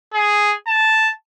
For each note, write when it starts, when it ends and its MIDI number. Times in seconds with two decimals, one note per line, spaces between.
0.14 0.54 68
0.67 1.11 81